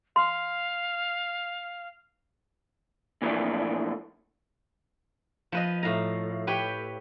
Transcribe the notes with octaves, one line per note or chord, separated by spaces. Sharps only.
F5 C6
A#2 E3 F3 G3 A3 D4
F3 B4 D#5
A2 F5 A#5
G4 B4 C#5 G5